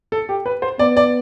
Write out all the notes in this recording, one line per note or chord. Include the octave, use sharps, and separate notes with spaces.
A4
G4
B4
C5
B3 D5
D5